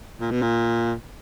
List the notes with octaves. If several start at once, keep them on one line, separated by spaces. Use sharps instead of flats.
A#2
B2
A#2